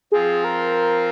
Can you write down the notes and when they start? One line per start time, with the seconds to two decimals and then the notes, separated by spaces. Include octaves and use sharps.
0.12 F3 C4 F4 G#4
0.44 A#4